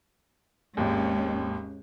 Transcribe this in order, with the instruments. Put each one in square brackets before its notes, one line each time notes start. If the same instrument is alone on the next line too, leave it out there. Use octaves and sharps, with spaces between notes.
[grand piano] G#1 D#2 [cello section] G#2 G#3 C#4